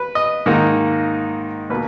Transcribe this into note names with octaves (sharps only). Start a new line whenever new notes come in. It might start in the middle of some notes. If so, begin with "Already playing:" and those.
Already playing: B4
D#5
G#2 D#3 A#3 D#4
B2 A#3 B4